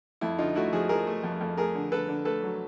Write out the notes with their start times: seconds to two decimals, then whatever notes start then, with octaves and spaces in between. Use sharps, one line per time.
0.21 F2 E4
0.38 D3 D#4 F4
0.55 A3 E4 F#4
0.72 F3 F#4 G#4
0.89 F3 G#4 A#4
1.07 A3
1.24 F2
1.41 F2
1.57 A3 G#4 A#4
1.75 D3
1.91 D3 A4 B4
2.08 D3
2.25 A3 A4 B4
2.42 F#3